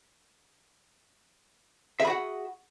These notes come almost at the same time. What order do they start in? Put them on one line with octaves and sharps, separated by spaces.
E5 G#4 B5 F#4 F#5